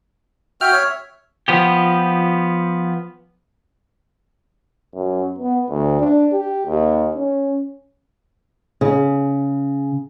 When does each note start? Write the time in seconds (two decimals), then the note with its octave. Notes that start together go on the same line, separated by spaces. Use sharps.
0.61 F#4 E5 G5 F6
0.72 C#5 E5
1.48 F3 B3 G4
4.94 F#2
5.39 B3
5.70 D2
6.00 D4
6.32 G4
6.67 D#2
7.16 C#4
8.81 C#3